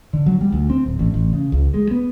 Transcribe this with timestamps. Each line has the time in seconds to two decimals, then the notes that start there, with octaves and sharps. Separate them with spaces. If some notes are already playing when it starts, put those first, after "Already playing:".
0.13 D3
0.26 F#3
0.41 G3
0.52 D2
0.70 C4
0.86 D1
0.99 A1
1.14 A1
1.33 C#3
1.52 C#2
1.74 G#3
1.91 B3